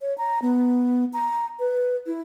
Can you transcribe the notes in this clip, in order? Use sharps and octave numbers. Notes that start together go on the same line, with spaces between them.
C#5
A#5
B3
A#5
B4
E4